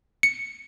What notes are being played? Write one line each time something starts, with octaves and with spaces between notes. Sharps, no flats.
C#7